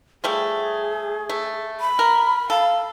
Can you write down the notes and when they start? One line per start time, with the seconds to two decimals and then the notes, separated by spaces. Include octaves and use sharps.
0.24 F3 G3 A3 G#4
1.29 A3
1.81 B5
1.99 A#4
2.50 A4 F5